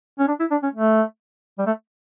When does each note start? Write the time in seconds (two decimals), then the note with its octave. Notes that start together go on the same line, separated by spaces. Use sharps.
0.19 C#4
0.28 D4
0.40 E4
0.51 D4
0.63 C#4
0.74 A3
1.58 G3
1.66 A3